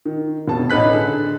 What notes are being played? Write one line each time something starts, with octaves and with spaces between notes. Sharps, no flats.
D#3
F1 B2 A5
A1 D#4 B4 F#6 B6
D3 G#4 A4